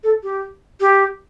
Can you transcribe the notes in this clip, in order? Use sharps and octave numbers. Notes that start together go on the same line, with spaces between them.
A4
G4
G4